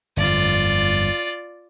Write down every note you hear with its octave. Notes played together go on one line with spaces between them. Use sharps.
G1 F2 F4 D5